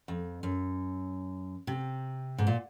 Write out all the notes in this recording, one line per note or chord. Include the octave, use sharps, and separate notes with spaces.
F2
F#2
C3
G#2
A#2